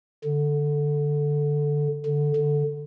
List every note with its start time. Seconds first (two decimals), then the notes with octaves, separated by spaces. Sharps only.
0.24 D3
2.06 D3
2.36 D3